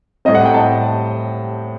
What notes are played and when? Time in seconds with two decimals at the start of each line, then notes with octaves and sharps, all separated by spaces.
0.25 A2 G3 C4 D#5
0.35 F#5
0.45 G5
0.54 A5